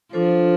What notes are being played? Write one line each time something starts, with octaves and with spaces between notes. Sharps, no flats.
F3 D4 F4 A4 C5